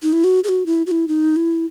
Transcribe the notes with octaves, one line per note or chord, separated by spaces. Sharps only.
D#4
E4
F#4
G#4
F#4
E4
F#4
E4
D#4
E4